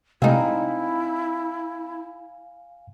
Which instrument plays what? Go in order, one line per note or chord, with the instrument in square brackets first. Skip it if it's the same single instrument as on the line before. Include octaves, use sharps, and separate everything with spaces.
[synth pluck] C3 G#3 A3 [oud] C4 D#4 [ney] E4 [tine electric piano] F5 G#5